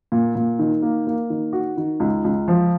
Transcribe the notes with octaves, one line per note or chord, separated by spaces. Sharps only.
A#2
A#2
D#3
A#3
A#3
D#3
F#4
D#3
C#2
C#2
F3